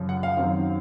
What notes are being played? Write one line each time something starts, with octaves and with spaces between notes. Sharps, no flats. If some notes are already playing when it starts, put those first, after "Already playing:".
Already playing: F#2 C#3 F3
F#5
F5
F#2 D#3 F#3 C4